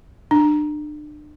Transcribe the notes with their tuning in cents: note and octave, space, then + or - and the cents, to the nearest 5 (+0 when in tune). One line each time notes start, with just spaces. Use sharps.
D4 +35